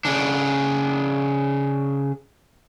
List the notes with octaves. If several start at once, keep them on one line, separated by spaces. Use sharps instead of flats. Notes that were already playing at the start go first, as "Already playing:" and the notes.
C#3 D4